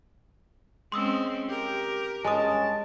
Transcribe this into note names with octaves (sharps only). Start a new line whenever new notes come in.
G#3 C4 C#4 C6 D#6 E6
G4 A#4
G2 G#3 C#4 G#5 A5 D#6